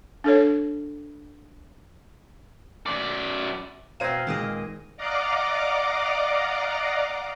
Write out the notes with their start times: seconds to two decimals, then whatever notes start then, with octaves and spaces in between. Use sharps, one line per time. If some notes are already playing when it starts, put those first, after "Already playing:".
0.24 D4 A4 C#5
2.86 F#2 D5
4.00 B2 C4 C5 F5 A#5 G#6 A#6 D#7
4.27 A#2 D#3 G#3 G#4 D#5
4.97 D5 D#5 F5 F#5 A#5 D6